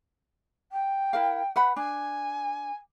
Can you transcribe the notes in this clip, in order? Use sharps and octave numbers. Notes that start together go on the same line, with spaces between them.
G5
E4 A#4 F5
B4 F#5 B5
D4 G#5